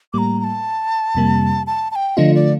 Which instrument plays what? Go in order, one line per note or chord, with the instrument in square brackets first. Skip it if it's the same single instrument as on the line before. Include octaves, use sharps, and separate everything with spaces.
[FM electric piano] A2 G3 A#3 [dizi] A#5 D6
[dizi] A#5
A5
[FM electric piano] F2 C3 G3 A#3
[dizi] A5
A5
G5
[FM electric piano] D3 F3 A3 D4 F4 [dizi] D#5
[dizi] D5